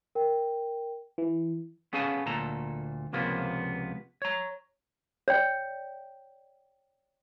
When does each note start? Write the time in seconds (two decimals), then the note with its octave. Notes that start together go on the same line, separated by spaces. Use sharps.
0.15 A#4 G5
1.18 E3
1.93 B3 C#4 G#4 A4 F5 G#5
2.26 D2 A#2 A4 A#5
3.13 C#2 C3 F3 A#3 B3
4.22 C#5 A#5
5.28 C#5 D5 G5